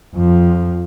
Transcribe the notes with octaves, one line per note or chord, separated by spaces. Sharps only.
F2 F3